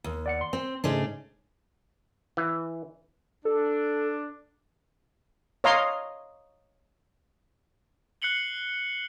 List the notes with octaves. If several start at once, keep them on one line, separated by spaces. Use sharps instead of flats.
D#2
D5 F#5 C#7
C6
C4
G#2 C#3 G#3 A3 C#4 D4
E3
D4 A4
C#5 D#5 F5 A#5 C6 D#6
F#6 C7 C#7 F#7 G7